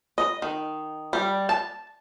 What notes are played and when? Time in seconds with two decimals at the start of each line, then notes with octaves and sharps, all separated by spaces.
0.18 D#5
0.42 D#3
1.13 G3
1.49 A5